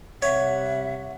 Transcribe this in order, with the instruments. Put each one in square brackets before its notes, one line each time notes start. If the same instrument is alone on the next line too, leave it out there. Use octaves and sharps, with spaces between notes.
[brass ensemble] C3 G3 F#5 [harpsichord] C#5 [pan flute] E5